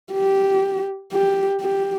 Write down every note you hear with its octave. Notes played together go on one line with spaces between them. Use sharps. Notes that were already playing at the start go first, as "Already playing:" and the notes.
G4
G4
G4